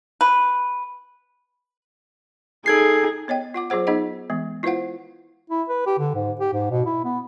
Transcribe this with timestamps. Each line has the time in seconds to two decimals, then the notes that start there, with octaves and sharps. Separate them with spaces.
0.21 B4
2.66 D#4 G#4 A4 G#6 C7
3.28 B3 C#5 D#5 G5
3.54 F4 F#5 D6
3.70 F#3 F4 G#4 C5 F#5
3.87 B3 D#4 G#4 D#5 F#5
4.30 E3 G#3 B3
4.63 E4 F4 B4 C5 F5 F#5
5.50 E4
5.69 B4
5.86 G4
5.99 D3
6.15 G#2
6.40 G4
6.53 G#2
6.71 B2
6.85 E4
7.04 B3